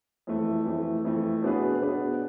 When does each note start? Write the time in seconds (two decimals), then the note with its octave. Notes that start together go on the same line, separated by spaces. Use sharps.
0.27 F2 E3 A3
0.65 F2 E3 A3
1.05 F2 E3 A3
1.42 B2 B3 D4 G#4 B4
1.82 B2 B3 D4 G#4 B4